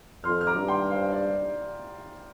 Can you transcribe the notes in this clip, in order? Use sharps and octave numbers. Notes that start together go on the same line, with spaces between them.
F2 C6 F6
F6
A#5 D6
G2
G5 C6
C5 F5
D5